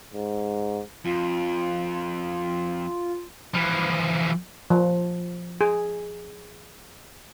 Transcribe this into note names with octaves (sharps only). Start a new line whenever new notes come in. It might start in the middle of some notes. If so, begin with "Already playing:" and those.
G#2
F2 F4
E3 F3
F3
G#4